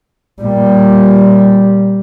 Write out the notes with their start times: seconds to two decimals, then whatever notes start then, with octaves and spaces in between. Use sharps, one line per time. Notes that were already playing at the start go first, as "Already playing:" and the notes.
0.42 A#2 G3